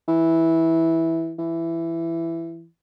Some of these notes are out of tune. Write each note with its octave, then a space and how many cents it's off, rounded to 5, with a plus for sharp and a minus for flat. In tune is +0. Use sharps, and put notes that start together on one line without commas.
E3 -10
E3 +10